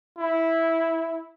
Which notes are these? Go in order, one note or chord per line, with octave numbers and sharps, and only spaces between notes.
E4